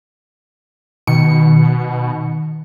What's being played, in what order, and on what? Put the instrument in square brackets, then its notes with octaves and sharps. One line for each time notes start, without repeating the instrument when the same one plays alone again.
[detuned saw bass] B2 [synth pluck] D#3 C#7